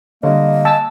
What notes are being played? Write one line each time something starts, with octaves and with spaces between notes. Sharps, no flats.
D3 G3 A#3 C#5 D#5
G#5 A5 E6